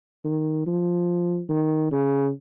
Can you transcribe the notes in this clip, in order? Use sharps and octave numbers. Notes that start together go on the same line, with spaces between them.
D#3
F3
D#3
C#3